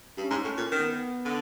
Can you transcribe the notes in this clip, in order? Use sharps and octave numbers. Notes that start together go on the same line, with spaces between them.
G2 C#4
G#2
A2
A#2
D#3 B3
D3